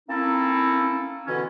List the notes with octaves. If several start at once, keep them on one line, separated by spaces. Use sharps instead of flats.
A#3 C4 C#4 D#4 E4 A4
B2 D3 E3 C#4